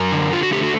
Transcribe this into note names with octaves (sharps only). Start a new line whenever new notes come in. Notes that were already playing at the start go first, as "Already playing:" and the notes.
Already playing: F#2 A#4
D3
D3 F4
F#4
A3 G4
F#4